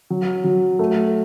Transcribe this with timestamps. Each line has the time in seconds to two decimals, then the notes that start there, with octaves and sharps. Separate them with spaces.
0.10 F#3
0.44 F#3
0.79 A3